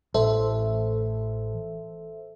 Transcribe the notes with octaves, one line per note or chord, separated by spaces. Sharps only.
A1 A4 C5 E5